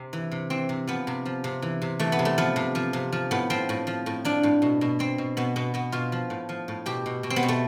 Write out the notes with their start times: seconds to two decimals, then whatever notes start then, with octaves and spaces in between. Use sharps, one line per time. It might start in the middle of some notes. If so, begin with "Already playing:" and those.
Already playing: C3 C4
0.13 E3
0.31 C3
0.50 E3 C4
0.69 C3
0.88 F3 B3
1.07 C3
1.25 F3
1.44 C3
1.62 E3
1.82 C3
1.99 E3 A3
2.12 B3
2.19 C3
2.25 A3
2.38 F3 B3
2.56 C3
2.75 F3
2.93 C3
3.12 F3
3.31 A2 B3
3.50 F3 C4
3.69 A2
3.87 F3
4.06 A2
4.25 F3 D4
4.43 A2
4.62 B2
4.81 B2
4.99 B2 C4
5.18 B2
5.37 B2 B3
5.56 B2 B3
5.74 B2 B3
5.92 B2 F4
6.12 F3
6.30 A2
6.49 F3
6.68 A2
6.86 B2 G4
7.06 B2
7.23 B2
7.30 C4
7.36 B3
7.43 B2
7.48 A3